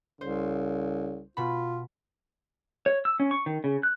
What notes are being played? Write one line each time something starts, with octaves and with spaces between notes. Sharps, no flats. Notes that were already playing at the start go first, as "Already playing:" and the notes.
C2 C#3 C5
B2 F4 B5
C#5
E6
C#4
C#6
D#3
C#3
F#6